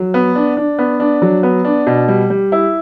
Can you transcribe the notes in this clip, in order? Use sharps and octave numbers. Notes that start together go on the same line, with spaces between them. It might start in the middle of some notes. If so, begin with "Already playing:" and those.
Already playing: F#3
B3
D4
D4
B3
D4
F#3
B3
D4
B2
G3
G3
E4